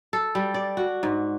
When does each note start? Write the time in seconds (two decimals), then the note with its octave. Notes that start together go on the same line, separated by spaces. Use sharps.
0.13 A4
0.35 G3
0.54 D5
0.77 F#4
1.03 G#2